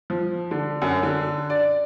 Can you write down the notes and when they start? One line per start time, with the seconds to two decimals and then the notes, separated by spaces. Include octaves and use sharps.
0.10 F3
0.51 D3
0.82 F#2
1.03 D3
1.50 D5